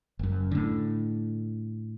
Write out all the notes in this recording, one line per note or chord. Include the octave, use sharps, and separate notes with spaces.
F#1 F#2
A2 D3